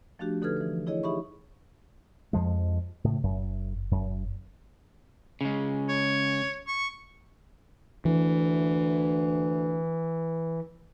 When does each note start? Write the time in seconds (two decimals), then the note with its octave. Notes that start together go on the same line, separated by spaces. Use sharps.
0.19 F3 A3 D4 F#4 G4
0.42 D3 D#4 A4 B4 F6 G#6
0.57 E3 F3
0.87 E4 G#4 C#5 D#5
1.03 D#4 G4 G#4 E5 B5 C#6
2.33 F2 F3 G#3
3.04 A2 C#3
3.23 F#1 F#2
3.91 F#2
5.41 C#3 G#3
5.89 C#5
6.68 C#6
8.05 D2 E3